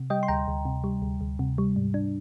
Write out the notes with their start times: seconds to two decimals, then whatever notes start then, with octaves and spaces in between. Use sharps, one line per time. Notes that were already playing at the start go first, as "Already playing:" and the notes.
Already playing: C3
0.10 G3 D#5 G5
0.23 C6
0.28 D2 G5 A#5
0.48 D2
0.65 C3
0.84 G3
1.02 D2
1.21 D2
1.39 C3
1.58 G3
1.76 G#2
1.94 D4